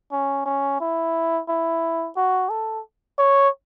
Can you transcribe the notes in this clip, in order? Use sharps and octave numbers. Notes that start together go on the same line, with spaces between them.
C#4
C#4
E4
E4
F#4
A4
C#5